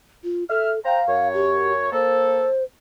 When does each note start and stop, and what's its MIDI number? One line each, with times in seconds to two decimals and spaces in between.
0.24 0.44 65
0.50 0.79 69
0.50 0.72 76
0.50 0.72 89
0.85 1.01 72
0.85 1.28 77
0.85 1.01 79
0.85 1.01 82
1.08 1.88 42
1.08 1.88 73
1.34 1.73 67
1.92 2.44 58
1.92 2.44 69
1.92 2.63 72